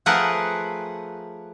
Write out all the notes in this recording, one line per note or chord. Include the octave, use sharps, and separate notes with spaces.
F3 A3 G#4 A#4 B4 F#5